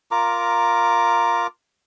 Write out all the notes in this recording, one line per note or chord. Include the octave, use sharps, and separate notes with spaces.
F4 A#4 A#5 D6